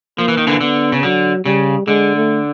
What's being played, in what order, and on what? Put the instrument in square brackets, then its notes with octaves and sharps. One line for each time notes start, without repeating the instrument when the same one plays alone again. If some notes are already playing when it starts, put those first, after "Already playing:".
[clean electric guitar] F3 [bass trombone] A#3
[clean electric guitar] E3
D#3
D3 E3
[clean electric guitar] D3 [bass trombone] B3
[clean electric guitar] C#3
[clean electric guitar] D3 [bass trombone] F#3
[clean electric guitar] C#3 [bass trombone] G3
[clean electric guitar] D3 [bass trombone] G#3
[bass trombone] A3